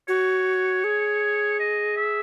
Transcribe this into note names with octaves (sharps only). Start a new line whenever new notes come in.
F#4 C#5
G#4
D#5
E5